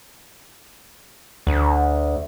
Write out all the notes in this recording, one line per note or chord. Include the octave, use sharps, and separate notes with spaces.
D2